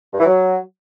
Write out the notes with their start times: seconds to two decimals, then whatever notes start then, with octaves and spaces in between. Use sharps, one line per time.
0.13 G2
0.20 E3
0.26 F#3